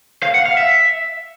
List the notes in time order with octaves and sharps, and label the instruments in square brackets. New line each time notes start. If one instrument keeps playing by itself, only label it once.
[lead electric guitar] F5
F#5
F5
E5